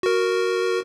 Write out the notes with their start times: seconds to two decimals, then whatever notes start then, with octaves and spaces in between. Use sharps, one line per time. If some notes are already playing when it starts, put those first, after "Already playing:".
0.03 F#4 A#4